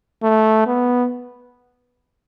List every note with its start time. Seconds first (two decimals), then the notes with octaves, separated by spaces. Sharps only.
0.22 A3
0.66 B3